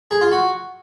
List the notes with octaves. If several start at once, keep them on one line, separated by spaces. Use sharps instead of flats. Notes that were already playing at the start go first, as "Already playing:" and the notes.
G#4
F4
F#4